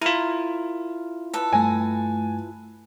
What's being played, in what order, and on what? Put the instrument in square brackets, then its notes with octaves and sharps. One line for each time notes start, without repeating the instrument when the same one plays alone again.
[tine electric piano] E4 F4 [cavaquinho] A#4
[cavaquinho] A4 B4
[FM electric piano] G2 A3 [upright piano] G#5